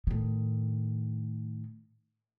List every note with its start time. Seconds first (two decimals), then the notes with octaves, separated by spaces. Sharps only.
0.07 A2 D#3